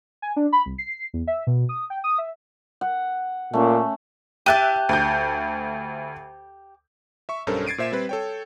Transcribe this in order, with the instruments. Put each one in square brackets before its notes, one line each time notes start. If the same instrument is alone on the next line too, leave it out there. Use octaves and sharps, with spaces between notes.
[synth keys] G#5
D4
B5
C2
C7
E2
E5
B2
D#6
G5
D#6
E5
[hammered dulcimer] F#5
[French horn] A#2 [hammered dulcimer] A3 C#4
[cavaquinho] G4 A5 D6 [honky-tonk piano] E5 F#6 D#7
[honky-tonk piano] D2 G6
[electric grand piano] E5 C#6
B1 G2 C#4 A4 A#4 C5
G#6 A6 C7 D7 D#7
A#2 C5 E5 G#6 E7
G3 C4 B4
A4 C#5 G5